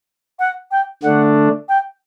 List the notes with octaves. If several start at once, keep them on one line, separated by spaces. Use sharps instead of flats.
F#5
G5
D3 A3 D4 F#5
G5